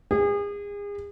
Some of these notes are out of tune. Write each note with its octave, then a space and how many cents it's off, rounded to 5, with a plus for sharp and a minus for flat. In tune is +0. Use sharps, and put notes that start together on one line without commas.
G#4 -35